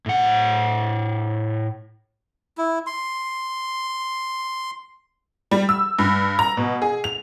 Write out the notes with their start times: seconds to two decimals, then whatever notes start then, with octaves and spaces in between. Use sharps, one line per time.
0.06 A2 F#5
2.58 E4
2.87 C6
5.51 G3
5.69 E6
5.99 G2
6.39 A#5
6.57 B2
6.82 G#4
7.04 F7